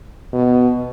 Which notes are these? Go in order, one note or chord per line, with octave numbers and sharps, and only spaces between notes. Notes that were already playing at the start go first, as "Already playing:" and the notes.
B2